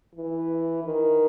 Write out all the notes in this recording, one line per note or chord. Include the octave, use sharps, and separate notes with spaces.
E3
D#3